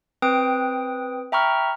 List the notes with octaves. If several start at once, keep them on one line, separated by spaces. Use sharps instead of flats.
C4 B4 G5 D#6 D7
E5 G5 A#5 B5 C#6 F6